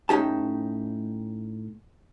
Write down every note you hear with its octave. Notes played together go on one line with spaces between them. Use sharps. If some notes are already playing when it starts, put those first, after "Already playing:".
A2 C#4 D#4 G4 A5